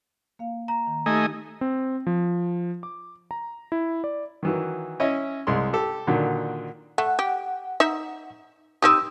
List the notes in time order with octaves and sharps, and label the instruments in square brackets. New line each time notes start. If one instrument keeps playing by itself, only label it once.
[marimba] A#3 F5
[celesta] A#5
[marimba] D#3
[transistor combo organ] A3 D#5 G#5 [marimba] D#4 G4
[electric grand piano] C4
F3
D6
A#5
E4
D5
[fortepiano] D#3 E3 F#3
C#4 E4 C#5 D#5
C2 G#3 C6
G4 A4
A#2 D3 D#3 F#3
[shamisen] A3 [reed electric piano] F#5
[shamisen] G4
D#4 E5
[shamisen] C4 D#4 G4 [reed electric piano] D#6 E6